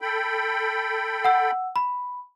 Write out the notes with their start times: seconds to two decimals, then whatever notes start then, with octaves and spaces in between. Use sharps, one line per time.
0.01 A4 G5 B5
1.25 F#5 E6
1.76 B5